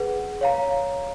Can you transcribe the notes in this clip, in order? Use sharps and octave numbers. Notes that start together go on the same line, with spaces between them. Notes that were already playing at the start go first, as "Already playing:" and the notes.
Already playing: G#4 B4 F#5
C#5 F5 A#5